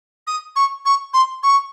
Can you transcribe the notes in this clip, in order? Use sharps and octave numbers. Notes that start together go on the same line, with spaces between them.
D#6
C#6
C#6
C6
C#6